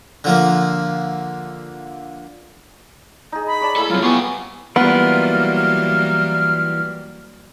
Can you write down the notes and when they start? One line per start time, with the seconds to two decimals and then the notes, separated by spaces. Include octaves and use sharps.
0.24 D3 F3 A#3
3.32 D#4 G#4
3.47 B5
3.61 C#5 D5 A5
3.76 A#3 E4 G#4 A4
3.90 F#3 G3 C4 F4
4.02 B3 F4 G4 F5 G#5 C#6
4.76 E3 F#3 G3 A#3 B3 F4 A#4 F6
5.56 F6